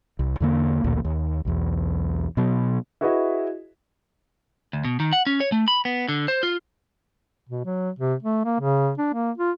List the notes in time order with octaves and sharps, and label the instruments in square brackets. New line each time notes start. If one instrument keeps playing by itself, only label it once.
[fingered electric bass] C2
E2 D3 A#3
A1 D2 A#2
D#2
B1 E2
B2 F#3
[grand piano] E4 F#4 G#4 B4 D#5 E5
[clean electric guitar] D2
B2
D#3
F#5
C#4
C#5
A3
B5
B3
D3
C5
F4
[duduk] B2
F#3
C3
A3
A#3
C#3
D4
A#3
F4